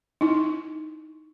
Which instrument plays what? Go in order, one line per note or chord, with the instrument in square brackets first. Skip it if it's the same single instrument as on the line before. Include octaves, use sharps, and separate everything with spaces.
[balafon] D#4 E4